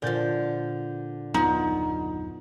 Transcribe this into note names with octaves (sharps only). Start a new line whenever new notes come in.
A#2 D3 F3 G6 A6
F#1 D#2 F#3 B3 D#4 F4